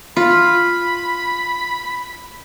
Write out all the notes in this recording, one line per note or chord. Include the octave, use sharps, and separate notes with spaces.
F4 B5